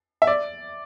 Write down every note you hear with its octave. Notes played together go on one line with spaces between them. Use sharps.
E5
D5